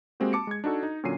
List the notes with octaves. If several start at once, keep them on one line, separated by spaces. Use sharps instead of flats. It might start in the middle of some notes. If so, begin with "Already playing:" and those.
G#3 A#3 C4 F#4 G4
A5 D6 C#7
G#3 G#6
D4 D#4 F#4 A4
D#4
A#2 D3 F#3 C#4 C7 D#7